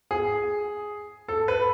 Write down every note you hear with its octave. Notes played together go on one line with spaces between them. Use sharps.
G#4
A4
B4